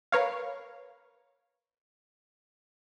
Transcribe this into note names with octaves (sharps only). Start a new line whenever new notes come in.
A#4 B4 C#5 F5